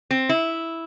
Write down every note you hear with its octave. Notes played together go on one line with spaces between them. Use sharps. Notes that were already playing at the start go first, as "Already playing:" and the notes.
C4
E4